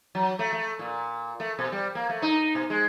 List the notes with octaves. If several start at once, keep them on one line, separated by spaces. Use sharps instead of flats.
F#3
A3
A3
A#2
A3
B2
G3
A#3
A3
D#4
B2
G#3